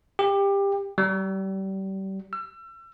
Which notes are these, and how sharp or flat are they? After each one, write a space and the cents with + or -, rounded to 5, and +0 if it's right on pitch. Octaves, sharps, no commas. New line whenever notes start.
G4 +20
G3 -30
E6 +35